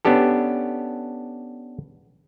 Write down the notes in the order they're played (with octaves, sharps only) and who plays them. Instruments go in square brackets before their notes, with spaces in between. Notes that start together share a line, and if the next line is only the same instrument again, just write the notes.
[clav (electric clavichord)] B3 C#4 D4 G4 A4